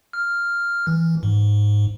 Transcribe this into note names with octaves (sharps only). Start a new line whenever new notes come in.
F6
E3
G#2